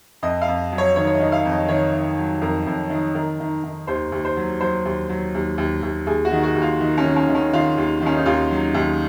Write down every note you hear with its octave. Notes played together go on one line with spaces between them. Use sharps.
F2 D#5
F5
F2
F#3
C#5
D#3 C#5
C#5
D#5
D#3
F5
F2
D#5
D#3 C#5
D#3
F#3
F2 A#4
F2
D#3
D#3 A#4
D#3
D#3
D#2 C5
D#2
C5
F#3
F#3 C5
D#2
F#3
D#2
D#2
D#2
D#2 G#4
F#4
D#3
F#4
D#2
F4
D#3
C#4
D#3
C#4
D#3
C#4
D#3 F4
D#2
D#3
C#4
D#4
D#2 F4
F#3
D#2